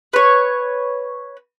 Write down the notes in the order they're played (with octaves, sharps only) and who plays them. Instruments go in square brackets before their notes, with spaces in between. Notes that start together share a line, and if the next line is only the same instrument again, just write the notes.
[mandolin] B4 C#5